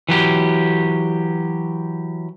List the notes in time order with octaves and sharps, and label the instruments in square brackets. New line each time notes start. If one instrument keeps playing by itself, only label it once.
[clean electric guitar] E3 F#3 G4